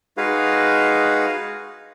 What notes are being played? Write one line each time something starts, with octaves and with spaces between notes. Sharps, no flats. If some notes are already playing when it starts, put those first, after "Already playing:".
G#3 D#4 F#4 G#4 B4 F5